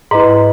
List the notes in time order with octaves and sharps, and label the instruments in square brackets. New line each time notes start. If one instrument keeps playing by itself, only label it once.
[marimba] G#2 [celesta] E4 B4 D#5 A#5